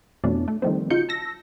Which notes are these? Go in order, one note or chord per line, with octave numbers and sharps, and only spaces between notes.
F2 B2 E3 A3 C#4 D4
A3
D#3 F3 G3 A3 C4
C#3 D#4 F4 F#4 G6 C#7
A5 E6 A#6